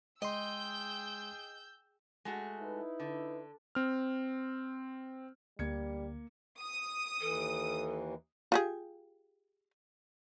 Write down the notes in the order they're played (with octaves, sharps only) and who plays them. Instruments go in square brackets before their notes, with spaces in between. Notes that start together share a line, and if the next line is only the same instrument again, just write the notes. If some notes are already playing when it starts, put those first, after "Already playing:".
[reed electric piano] G#3 C6 [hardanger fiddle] G#4 G5 [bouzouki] D#5 [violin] E6 G6
[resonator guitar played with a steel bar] G#3 A3 F#4
[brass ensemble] D#4 E4 B4
[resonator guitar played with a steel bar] D3
[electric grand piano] C4 F6
[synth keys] D2 [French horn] G3 [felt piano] A#3 G#6 C#7
[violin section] D#6
[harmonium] D#2 E3 [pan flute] A4
[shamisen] F4 G4 G#4